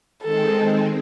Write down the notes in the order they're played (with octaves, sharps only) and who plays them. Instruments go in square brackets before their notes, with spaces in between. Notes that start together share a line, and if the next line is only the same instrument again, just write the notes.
[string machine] D#3 G#3 C4 [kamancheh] A4